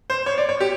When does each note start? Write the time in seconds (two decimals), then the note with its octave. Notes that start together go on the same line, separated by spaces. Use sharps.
0.10 C5
0.26 C#5
0.38 D5
0.49 C#5
0.60 G4